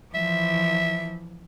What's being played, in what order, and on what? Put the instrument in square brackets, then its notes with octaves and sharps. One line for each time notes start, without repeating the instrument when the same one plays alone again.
[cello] E3 F3 [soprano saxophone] E5